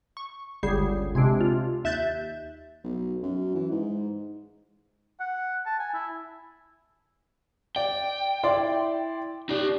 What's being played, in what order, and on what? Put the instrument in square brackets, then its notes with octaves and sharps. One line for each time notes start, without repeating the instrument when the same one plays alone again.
[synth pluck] C#6
G1 C#2 D3 G3 G#4 C7
C3 G#3 C4 D4
F4
D#2 E5 F#6 G6 A6
[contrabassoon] B1
F#2
E3
G#2
[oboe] F#5
A5
G#5
E4
[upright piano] D5 [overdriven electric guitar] G5
[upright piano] E4 D5 C6
[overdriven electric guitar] D#4 D5 [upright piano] G4